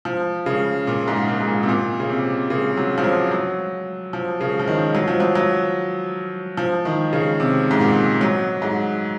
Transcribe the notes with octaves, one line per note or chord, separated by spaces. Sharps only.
F3
C#3
A#2
G#2
A#2
G#2
A#2
C3
A#2
C#3
C3
C#3
F#3
F3
F#3
F#3
F3
C#3
F3
D#3
F#3
F3
F#3
F#3
F3
D#3
C#3
C3
G#2
A#2
F#3
G#2